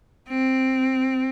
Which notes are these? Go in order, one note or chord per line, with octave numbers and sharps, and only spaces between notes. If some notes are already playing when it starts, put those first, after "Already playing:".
C4